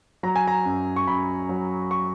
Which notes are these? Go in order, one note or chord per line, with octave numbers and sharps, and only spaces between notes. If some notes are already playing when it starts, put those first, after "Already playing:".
F#3 A#5
G#5
A#5
F#2
C#6
F#2 B5
F#3
C#6